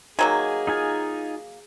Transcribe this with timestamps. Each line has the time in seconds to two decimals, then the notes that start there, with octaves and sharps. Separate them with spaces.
0.19 D#3 F#3 A#3 G#4 G#5
0.67 D#4 F4 G#5